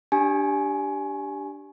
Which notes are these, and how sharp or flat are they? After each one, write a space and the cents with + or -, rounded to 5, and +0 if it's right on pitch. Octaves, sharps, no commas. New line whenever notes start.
D4 -5 G4 +0 G#5 +20